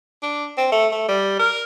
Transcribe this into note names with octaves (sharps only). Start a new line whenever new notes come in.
D4
C4
A3
A3
G3
A#4